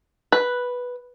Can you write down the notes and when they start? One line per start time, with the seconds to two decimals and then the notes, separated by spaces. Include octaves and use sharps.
0.32 B4